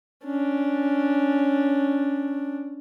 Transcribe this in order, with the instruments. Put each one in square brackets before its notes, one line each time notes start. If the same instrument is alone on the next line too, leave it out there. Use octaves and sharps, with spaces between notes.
[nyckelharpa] C#4 D4